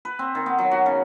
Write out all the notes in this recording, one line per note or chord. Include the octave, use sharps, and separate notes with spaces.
B4
C4
D#3
B3
F#3
F#4
C#3